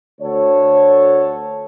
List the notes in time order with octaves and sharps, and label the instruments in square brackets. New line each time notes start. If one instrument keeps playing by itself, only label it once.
[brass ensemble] D2 F#4 A4 C#5